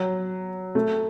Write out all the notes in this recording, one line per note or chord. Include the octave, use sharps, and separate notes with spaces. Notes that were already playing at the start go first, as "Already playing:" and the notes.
Already playing: F#3
A3